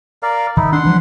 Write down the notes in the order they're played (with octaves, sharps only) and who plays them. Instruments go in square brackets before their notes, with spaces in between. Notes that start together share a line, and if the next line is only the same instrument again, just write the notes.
[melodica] A#4 D5 F5
[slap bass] D#3 [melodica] D#4 E4
[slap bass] D4 [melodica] F#5 C6
[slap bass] E3 F3 G3